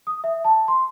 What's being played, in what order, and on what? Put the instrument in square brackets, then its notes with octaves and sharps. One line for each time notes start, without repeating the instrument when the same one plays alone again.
[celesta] D#6
E5
A5
C6